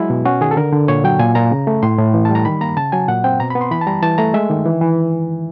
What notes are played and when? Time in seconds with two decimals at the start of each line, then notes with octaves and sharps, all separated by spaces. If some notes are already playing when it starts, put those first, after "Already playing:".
Already playing: F#3 G#3 E4
0.10 B2
0.25 C#4 F#4
0.41 D#3 G#4
0.51 A4
0.57 D3 A#4
0.73 D3
0.88 A#2 C#5
1.04 F#3 G5
1.19 A#2 G#5
1.35 A#2 A#5
1.52 C#3
1.67 A3
1.83 A2 C6
1.98 A2
2.14 E3
2.25 G3 A5
2.35 A#5
2.45 D#3 B5
2.61 A#3 A#5
2.77 C#3 A5
2.92 F#3 G#5
3.08 A#2 F#5
3.24 C4 G5
3.40 B2 A#5
3.50 B5
3.55 B3
3.61 C6
3.71 E3 B5
3.81 A5
3.87 G3 A#5
4.03 E3 A5
4.18 A3 A#5
4.34 G#3 E5
4.50 D#3
4.66 E3
4.81 E3